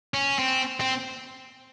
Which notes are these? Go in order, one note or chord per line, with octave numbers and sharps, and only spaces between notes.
C#4
C4
C4